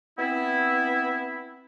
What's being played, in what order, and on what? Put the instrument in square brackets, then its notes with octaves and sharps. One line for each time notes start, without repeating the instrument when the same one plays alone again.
[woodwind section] B3 C4 E4